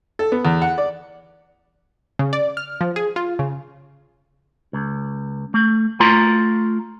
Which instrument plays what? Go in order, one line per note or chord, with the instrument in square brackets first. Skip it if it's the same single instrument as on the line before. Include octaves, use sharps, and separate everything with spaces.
[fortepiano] A4
B3
E2
F#5
D5
[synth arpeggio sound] C#3
D5
F6
F3
G#4
F4
C#3
[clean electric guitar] C#2
A3
A3 F4 A#5 C6